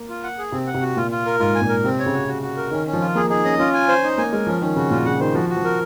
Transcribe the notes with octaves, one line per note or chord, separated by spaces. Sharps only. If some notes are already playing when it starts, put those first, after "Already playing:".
Already playing: A#3
F4
F#5
G#4
C3 C4
F#5
C3
F#4
A#2 F4
F4
A#4
G#2 F4
G#5
A#2
A#4
C3 C4
C#5
C#3
F#4
F#4
F#4
A#4
D#3 C#4
C#4
F3
F4
A#3 G#4
D#4 G#4
C#4 D#5
C#4 F4
G#5
C5
D#4
A#3 G#5
G#3 A#4
F3 C#4
D#3 C#4
C#3 F#4
A#2 F4
C#3 F#5
D#3 C5
F3 F#4
F#4
F3
A#4